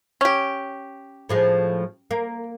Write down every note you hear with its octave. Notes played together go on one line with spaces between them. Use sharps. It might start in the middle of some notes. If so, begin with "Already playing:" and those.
C#4 G4
A2 F3 G#3
A#3